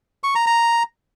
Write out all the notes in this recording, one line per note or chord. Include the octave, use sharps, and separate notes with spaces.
C#6
A#5
A#5